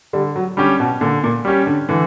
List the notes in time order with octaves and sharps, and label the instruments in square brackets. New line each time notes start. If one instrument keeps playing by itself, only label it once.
[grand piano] D3 [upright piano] G3
[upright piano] F#3
[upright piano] D3 [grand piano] G3 C#4 G4
[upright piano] B2
[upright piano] A#2 [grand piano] D3
[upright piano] A#2
[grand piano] G3 C#4 G4
[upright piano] D3
[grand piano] D3 [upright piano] E3